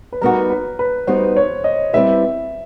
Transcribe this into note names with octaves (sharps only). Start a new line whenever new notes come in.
B4
G3 B3 D#4 F#4 A#4
B4
B4
G3 B3 D#4 F#4 C5
C#5
D#5
G3 C4 E4 G4 B4 E5